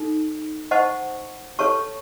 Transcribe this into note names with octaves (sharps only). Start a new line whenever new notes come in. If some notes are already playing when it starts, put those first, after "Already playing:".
Already playing: D#4 A4
C5 D#5 F#5 A5 C#6
A4 C#5 A5 C#6